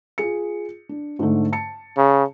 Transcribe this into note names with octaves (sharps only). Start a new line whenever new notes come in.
F4 G#4 C#7
D4
G#2 D3 A3
A5 C#7
C#3